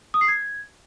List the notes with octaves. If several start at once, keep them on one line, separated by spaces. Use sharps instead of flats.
D#6
C7
G#6